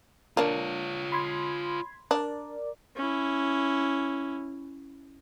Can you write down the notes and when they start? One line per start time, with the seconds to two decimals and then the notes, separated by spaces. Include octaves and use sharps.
0.37 A#3 D4 F4 C#5
1.12 B5 C6 G#6
2.11 D4 A#4 D5
2.96 C#4 E4